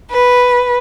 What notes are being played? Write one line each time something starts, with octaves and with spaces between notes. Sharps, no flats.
B4